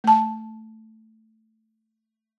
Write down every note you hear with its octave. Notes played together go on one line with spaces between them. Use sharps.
A3 A5